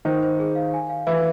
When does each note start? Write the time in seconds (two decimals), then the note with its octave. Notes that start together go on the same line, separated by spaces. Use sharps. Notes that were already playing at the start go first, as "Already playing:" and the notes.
0.05 D#3 D#4 C5
0.23 C5
0.39 G#4
0.55 F5
0.73 G#5
0.89 F5
1.07 E3 E4 B4